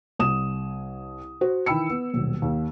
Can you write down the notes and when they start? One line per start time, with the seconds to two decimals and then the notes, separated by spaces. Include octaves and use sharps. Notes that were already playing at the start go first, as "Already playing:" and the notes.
0.19 C2 D#6 E7
1.41 F#4 C5
1.66 D#3 E3 G5 B5 E6 C#7
1.90 B3
2.14 D#1 B1
2.42 D#2